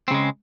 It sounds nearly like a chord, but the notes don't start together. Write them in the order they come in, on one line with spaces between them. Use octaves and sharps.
C4 C#3 G#3